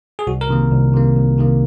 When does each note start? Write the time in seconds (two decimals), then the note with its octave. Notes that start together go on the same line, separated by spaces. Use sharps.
0.19 G#4
0.27 C2 F#4
0.41 A#4
0.49 C3 D#3 A#3
0.72 C2
0.94 C3 D#3 A#3
1.16 C2
1.38 C3 D#3 A#3